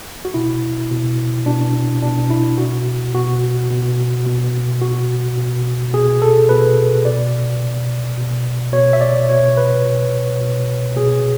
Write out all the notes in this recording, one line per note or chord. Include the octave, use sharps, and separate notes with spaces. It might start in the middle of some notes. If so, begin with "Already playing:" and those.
F#4
B2 E4
B2
B2 D4
B2 D4
E4
B2 F#4
B2 F#4
B2
B2
B2 F#4
B2
B2 G#4
A4
B2 B4
B2 D5
B2
B2
B2 C#5
E5
D5
B2 C#5
B4
B2
B2
B2 G#4